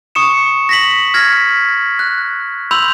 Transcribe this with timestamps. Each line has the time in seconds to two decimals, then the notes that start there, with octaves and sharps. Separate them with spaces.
0.15 C#6 D#6 C#7 E7
0.69 A#6 B6 F#7
1.14 F6 G#6 A#6 B6
1.99 F#6
2.71 B5 C6 E6 G6 F7